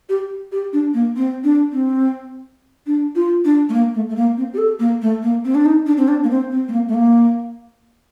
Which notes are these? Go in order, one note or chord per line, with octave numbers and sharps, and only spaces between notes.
G4
G4
D4
A#3
C4
D4
C4
D4
F4
D4
A3
A#3
A3
A3
A#3
C4
G4
A4
A#3
A3
A#3
C4
D4
D#4
D4
C4
D4
A#3
C4
C4
A3
A#3
A3
A#3